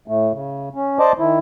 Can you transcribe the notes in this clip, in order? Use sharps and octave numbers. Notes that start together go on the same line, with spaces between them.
A2 A3
C#3
C#4
C5 D5 D#5 A5 D6
D#3 E4